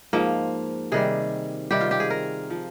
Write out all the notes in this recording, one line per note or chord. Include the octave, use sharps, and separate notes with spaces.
G#2 F3 A#3
C3 D#3 G3 G#4
C3 D#3 G3 G4
F4
G4
G#4
A#4
F3